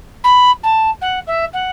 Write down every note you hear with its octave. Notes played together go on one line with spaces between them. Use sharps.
B5
A5
F#5
E5
F#5